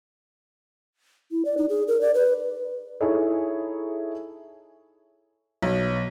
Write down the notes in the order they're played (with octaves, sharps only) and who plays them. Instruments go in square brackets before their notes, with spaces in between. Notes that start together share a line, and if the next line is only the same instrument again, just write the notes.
[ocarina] E4
D5
D#4
G#4
A#4
D5
B4
[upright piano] D#4 E4 G#4 A4 C#5
[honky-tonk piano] B1